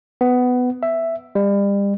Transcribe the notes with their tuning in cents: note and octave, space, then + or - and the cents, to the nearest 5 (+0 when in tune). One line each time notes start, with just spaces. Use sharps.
B3 +15
E5 +5
G3 +35